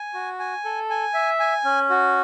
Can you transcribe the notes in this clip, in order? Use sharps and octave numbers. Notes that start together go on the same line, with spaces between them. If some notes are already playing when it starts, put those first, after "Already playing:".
Already playing: G#5
F#4
G#5
A4
G#5
E5
G#5
C#4
F#4